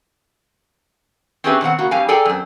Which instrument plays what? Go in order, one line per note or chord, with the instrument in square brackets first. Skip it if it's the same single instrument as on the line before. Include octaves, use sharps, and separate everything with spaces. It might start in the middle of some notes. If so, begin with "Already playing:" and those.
[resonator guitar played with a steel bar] C4 C#4 G4 G#4 B4 E5
B2 D#3 C4 F#5
C#3 A#3 F#4
G2 G3 C4 F5 G#5
G#4 A4 D5 G5 G#5 A#5
F#2 C4